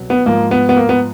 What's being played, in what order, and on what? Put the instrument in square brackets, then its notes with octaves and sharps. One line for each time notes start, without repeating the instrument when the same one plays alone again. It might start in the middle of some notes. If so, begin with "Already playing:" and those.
Already playing: [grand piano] C2 B2 F#3
B3
G#2 F3 A#3
B3
B3
A#3
B3